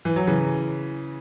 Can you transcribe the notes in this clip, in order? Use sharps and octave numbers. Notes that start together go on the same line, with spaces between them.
E3
F#3
C#3 E3